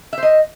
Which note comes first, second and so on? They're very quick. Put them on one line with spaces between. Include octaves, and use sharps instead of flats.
E5 C5 D#5